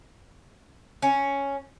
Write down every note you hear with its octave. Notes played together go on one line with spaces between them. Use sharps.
C#4